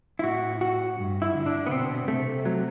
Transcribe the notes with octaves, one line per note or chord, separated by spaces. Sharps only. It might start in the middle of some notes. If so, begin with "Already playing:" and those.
E4
A2 F#4
F#4
G2
E4
D3
D4
B3
B2 C4
C3 A3
F#3